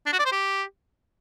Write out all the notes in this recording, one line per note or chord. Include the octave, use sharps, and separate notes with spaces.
D4
F#4
D5
C5
G4